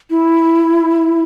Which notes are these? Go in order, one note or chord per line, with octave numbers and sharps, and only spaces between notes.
E4